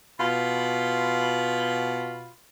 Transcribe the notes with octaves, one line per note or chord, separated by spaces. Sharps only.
B2 F4 B5